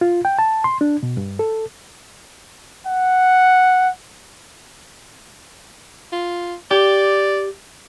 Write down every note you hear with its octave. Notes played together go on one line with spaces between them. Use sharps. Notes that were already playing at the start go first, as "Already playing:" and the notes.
F4
G5
A5
C6
D4
B2
G2
A4
F#5
F4
G4 D5